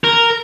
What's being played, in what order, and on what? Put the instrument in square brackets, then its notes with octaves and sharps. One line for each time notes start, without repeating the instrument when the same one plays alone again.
[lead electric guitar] A#4